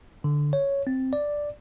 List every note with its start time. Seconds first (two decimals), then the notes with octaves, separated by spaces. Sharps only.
0.24 D3
0.53 C#5
0.87 C4
1.13 D5